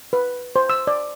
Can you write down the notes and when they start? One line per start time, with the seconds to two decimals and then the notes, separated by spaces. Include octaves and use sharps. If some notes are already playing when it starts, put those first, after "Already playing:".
0.13 B4
0.56 C5
0.70 E6
0.87 D5